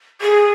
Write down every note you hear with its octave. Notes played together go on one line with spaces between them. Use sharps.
G#4